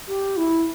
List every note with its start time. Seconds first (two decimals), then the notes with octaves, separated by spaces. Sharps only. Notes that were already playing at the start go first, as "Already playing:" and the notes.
0.08 G4
0.37 E4